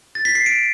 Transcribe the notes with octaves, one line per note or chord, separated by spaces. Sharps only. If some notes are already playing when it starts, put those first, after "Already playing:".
A6
B6
C7
D7